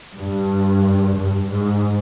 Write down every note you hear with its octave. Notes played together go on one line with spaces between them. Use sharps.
G2
G2
G#2